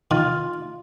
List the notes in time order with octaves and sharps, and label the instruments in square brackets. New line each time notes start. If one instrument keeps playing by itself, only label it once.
[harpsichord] D#3 [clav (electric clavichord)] F4